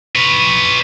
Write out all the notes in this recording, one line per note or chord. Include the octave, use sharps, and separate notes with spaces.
B4 C#5